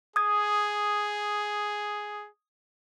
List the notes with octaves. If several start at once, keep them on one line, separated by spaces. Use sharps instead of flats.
G#4 D#6 G#6